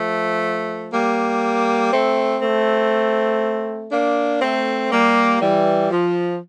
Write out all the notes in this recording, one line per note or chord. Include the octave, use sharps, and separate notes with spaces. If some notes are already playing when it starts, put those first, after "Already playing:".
Already playing: F3 A3
G3 A#3
A3 C4
A3 C4
A#3 D4
A3 C4
G3 A#3
E3 G3
F3